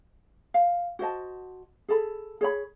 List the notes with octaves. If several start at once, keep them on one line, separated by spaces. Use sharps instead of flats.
F5
F#4 C5 D#5 A5
G#4 A4 B5
G#4 C#5 B5